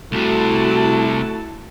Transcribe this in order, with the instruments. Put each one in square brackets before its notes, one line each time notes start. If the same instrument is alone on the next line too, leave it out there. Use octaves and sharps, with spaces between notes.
[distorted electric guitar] C2 C3 [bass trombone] A3 [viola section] E4 F#4 A5